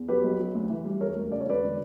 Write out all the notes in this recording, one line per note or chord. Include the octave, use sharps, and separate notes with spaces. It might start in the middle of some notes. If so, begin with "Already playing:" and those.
Already playing: E2
F#3 G4 B4
B1
F#3
D2
E3
G3
E1 A#4 C#5
D2
C#3 D5
C#5
E1 B4 D5
D3